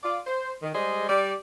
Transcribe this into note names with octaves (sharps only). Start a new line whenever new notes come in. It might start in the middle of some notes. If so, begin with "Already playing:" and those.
F4 D5
C5
D#3
G3 G#3 G#4 C5 D5 D#5
G3 D5